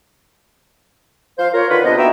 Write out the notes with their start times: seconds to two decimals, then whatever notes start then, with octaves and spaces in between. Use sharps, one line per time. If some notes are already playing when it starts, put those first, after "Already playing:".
1.39 F3 C5 F5
1.54 F4 A#4 C#5
1.70 D3 D#3 F4 B4
1.85 C3 B3 D4 C5 D#5
1.98 A#3 B3 D#4 F#4 E5 G5